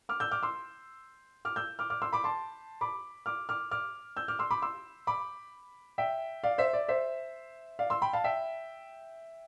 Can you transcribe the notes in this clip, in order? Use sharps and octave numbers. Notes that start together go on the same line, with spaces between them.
D6 F6
E6 G6
D6 F6
C6 E6
D6 F6
E6 G6
D6 F6
D6 F6
C6 E6
B5 D6
A5 C6
B5 D6
D6 F6
D6 F6
D6 F6
E6 G6
D6 F6
C6 E6
B5 D6
C6 E6
B5 D6
E5 G5
D5 F5
C5 E5
D5
C5 E5
D5 F5
C6 E6
G5 B5
F5 A5
E5 G5